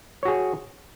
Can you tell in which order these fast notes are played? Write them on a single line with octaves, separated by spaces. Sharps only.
C#5 F#4 G#4